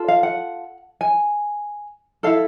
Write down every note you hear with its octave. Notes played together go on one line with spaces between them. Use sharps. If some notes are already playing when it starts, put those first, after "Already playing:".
Already playing: F4 A4
F5
F#5
G#5
E4 A4 F5